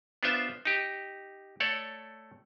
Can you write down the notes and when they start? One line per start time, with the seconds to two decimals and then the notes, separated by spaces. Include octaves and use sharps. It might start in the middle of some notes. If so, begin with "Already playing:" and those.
0.23 B3 D4 F4 C5 E5
0.65 D#4 G4
1.60 A3 A4 C#5 D5